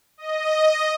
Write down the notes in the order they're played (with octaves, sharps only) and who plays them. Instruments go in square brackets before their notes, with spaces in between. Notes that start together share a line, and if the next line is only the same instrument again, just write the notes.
[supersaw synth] D#5